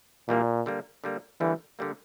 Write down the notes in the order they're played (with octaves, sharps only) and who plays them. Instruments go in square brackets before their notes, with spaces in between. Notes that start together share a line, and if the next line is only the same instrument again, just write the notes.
[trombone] A#2 [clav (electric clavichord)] E3 G3 A#3 D4
[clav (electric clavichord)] D3 G3 A#3
D3 G3 A#3
[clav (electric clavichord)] D3 G3 A#3 [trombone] E3
[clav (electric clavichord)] D3 G3 A#3